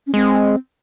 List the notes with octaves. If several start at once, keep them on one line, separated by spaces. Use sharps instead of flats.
C#4
G#3 C4